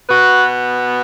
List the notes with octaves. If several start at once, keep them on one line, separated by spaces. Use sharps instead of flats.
B2 B3 F#4 B4